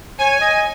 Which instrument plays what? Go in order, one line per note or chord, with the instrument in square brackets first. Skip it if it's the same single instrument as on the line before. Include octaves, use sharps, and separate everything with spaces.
[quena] C#5 [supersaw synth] G#5
[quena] D#5